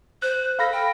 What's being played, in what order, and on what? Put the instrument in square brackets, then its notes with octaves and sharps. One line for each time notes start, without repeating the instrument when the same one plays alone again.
[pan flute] C5 [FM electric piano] F#6
[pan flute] A4 [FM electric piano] F5 B5 A#6
[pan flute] G5